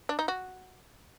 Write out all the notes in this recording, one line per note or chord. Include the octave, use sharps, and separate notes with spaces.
D4
D#4
F#4